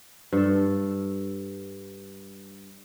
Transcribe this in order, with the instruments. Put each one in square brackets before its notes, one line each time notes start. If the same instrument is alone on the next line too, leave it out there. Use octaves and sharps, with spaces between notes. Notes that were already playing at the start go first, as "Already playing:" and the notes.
[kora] G2 A4